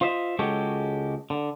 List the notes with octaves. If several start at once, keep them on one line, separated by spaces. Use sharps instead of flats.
F4 C5 D#5 E5
C#2 G#3 F#4 G4 A4 C#5
D3